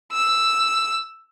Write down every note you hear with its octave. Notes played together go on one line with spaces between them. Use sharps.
E6